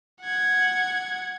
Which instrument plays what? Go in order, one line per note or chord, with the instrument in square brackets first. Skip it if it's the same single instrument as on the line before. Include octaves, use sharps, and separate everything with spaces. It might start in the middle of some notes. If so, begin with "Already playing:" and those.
[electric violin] F#5 G#6